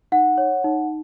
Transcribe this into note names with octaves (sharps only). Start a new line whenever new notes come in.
D#4 F#5
C#5
D#4